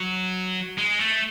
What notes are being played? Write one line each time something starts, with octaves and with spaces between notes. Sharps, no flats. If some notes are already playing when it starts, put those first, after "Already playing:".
Already playing: F#3
G#3
A3